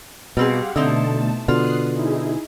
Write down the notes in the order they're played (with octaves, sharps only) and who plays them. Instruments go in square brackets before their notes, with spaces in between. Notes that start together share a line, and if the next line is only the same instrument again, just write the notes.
[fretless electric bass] B2 [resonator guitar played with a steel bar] G3 C4 G#4 [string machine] G4 F5 F#5
[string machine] B2 A3 A5 [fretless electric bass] D3 [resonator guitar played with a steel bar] C4 D#4 E4
[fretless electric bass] B2 D3 [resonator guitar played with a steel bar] F4 [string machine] D#6 F#6 C7
[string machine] D#4 E4 G#4